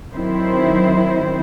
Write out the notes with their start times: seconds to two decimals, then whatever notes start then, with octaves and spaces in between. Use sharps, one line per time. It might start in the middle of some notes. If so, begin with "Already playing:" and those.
0.12 D#3 F#3 C4 E4 C5